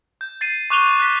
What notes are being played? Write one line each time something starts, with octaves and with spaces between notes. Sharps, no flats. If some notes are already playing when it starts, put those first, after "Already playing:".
G6
A6 C7 D#7
C#6 D6 F#6 D#7 F7 G7
F#6 B6